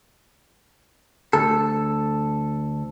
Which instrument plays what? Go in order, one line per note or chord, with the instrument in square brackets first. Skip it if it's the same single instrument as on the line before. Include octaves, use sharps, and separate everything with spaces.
[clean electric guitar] D2 A4